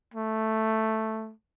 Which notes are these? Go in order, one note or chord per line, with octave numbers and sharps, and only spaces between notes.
A3